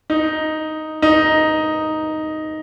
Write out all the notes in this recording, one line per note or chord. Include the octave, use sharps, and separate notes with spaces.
D#4
D#4